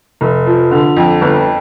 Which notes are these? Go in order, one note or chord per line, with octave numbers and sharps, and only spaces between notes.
F1
F3
D3
F2
G1